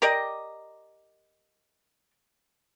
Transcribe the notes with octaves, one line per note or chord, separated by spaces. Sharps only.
G4 A#4 D5 D#5